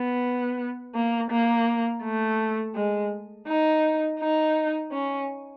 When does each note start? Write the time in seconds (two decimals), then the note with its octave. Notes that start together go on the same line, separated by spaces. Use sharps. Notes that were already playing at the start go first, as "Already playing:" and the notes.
Already playing: B3
0.95 A#3
1.31 A#3
2.04 A3
2.75 G#3
3.47 D#4
4.20 D#4
4.92 C#4